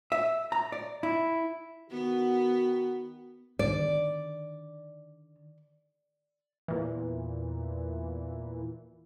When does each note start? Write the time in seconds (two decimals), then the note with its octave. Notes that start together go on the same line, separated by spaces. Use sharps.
0.12 E5
0.52 A#5
0.72 D5
1.03 E4
1.91 D#3 B3 F#4
3.59 D3 D#3 D5
6.68 E2 A#2 E3